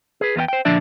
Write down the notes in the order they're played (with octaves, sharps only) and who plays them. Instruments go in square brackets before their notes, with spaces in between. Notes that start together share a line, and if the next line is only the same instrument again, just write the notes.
[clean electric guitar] G#4 B4
E2 B3 E4 G5
C5 G5
A#2 D3 F3 D4 D5 E5